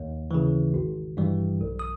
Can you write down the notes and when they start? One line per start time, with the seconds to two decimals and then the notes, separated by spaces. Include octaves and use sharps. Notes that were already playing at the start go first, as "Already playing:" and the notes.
Already playing: D#2
0.31 C#3 E3
0.74 G#1
1.17 G2 E3 G3
1.61 B1
1.79 D#6